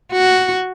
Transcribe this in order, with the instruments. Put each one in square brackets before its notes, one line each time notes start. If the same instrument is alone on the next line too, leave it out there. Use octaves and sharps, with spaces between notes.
[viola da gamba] F#4